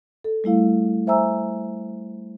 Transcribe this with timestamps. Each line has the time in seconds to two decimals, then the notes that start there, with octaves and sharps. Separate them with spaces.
0.24 A4
0.44 G3 A3 E4 F5
1.07 C5 E5 G#5 A#5 E6